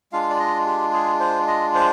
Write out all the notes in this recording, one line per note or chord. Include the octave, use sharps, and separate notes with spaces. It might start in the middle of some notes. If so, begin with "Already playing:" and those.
G#3 D4 F4 F5
D5
D#5
G4
G#4
C5
D#5
C5